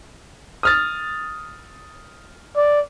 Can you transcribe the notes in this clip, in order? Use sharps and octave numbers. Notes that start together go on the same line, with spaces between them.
D#6 F6 A6
D5